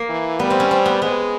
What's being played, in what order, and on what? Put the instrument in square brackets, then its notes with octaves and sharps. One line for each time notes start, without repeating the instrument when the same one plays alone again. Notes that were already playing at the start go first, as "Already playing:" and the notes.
Already playing: [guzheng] A#3
[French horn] E3
[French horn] G3 [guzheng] B3
[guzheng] C4
C#4
C4
B3
[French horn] G#3 [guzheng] B3